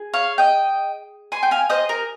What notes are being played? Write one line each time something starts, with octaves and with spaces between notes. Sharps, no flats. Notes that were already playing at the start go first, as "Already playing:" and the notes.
Already playing: G#4
C#5 F5
D#5 G5
G#5 C6
G5
F5 G#5
C5 D#5
A#4